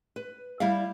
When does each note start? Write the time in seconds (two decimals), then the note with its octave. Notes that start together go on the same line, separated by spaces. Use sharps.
0.16 B4
0.60 G3 E4 D5 E5 F5